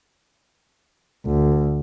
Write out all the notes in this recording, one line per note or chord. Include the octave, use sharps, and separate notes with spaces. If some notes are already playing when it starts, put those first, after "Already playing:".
D2